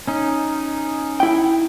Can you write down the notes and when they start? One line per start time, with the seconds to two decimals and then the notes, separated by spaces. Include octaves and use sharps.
0.07 C#4 D#4
1.20 E4 G5